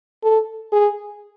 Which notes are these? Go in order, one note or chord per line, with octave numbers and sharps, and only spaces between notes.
A4
G#4